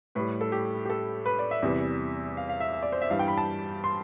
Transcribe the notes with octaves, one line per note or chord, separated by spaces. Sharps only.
A2 G3 B4
A4
G4
G4
A4
B4
D5
E5
E2 C3 E3 G3
F5
F5
E5
E5
D5
C5
E5
G2 E3 G3 F5
G5
B5
A5
C6